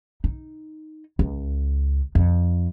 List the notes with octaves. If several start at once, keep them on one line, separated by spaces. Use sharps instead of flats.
D#4
C#2
F2